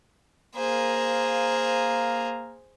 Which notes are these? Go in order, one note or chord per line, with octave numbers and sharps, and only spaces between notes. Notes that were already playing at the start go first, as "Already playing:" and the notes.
A#3 G#4 C5 F5 A#5